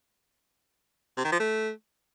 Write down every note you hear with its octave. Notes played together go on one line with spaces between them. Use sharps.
C3
D#3
F3
A3